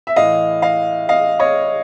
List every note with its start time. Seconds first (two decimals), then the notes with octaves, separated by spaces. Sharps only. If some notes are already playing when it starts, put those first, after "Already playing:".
0.07 E5
0.16 A2 E3 D#5 F5
0.62 D#5 F5
1.09 D#5 F5
1.39 C#5 D#5